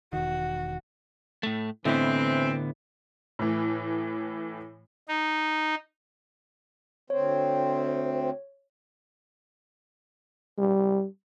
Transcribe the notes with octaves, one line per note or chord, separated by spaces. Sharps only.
E1 D#3 F#4
A2 A3
A2 D3 E3 B3 C4 D#5
A2 E3
D#4
D2 C4 C#5
G3